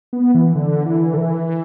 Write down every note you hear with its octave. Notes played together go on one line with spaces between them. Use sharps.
B3
E3
D3
E3
D3
E3